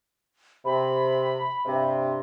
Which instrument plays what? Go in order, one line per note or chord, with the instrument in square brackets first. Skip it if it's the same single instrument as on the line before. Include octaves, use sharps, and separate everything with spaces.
[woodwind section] C3 [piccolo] B5
[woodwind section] G2 C3